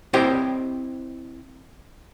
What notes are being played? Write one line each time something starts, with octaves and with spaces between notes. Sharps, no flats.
C4 E4 G4 C5 D#5 G5